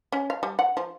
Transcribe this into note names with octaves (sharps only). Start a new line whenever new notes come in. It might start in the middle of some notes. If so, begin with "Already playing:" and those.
C#4
F5
G3
F#5
F3